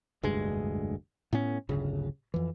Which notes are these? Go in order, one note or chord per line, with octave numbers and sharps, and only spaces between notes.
F1 D2 G2 G#3
A2 B3 C#4
D1 G1 C#3
F2 E3